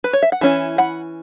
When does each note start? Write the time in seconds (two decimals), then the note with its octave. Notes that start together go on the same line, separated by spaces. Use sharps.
0.04 B4
0.13 C#5
0.22 E5
0.32 F#5
0.41 E3 C#4 E4
0.78 F#5 B5